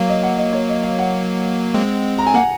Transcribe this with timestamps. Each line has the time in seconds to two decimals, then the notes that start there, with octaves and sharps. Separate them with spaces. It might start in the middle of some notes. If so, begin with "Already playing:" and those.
Already playing: F#3 A#3 F5
0.09 D#5
0.23 F#5
0.38 D#5
0.53 C#5
0.69 D#5
0.83 F5
0.99 F#5
1.74 G#3 C4
2.18 A#5
2.26 G#5
2.34 A#3 F#5